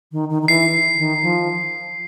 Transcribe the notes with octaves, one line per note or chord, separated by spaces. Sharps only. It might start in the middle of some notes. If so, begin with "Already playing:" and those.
D#3
D#3
D#3
E3 C7
D#3
F3